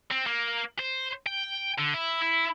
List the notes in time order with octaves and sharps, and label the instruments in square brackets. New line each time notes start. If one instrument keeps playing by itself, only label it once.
[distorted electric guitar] C4
A#3
C5
G5
D3
E4
E4